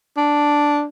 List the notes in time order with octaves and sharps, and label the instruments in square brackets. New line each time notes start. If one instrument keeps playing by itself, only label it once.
[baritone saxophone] D4